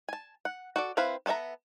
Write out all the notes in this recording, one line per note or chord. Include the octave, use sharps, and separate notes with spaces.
G#5 A5
F#5
F#4 A4 D5
C4 E4 B4 F5 B5
B3 A4 C#5 E5 A#5